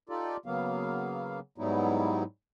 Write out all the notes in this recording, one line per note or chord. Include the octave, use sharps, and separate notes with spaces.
D#4 F4 G4 A4 D5
C#3 F#3 A#3 B3 F5
G#2 F#3 G3 B3 D#4 E4